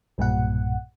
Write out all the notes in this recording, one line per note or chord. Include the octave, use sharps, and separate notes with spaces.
B1 G2 A#2 F#5